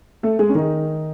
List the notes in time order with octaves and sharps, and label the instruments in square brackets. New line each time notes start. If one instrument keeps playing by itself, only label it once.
[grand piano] A3 A4
G#3 G#4
C#4
D#3 D#4